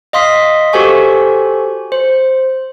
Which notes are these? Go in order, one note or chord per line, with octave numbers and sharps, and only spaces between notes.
D#5 F5 C6 D#6 B6
F#4 G4 A4 C5 G#5 C#6
C5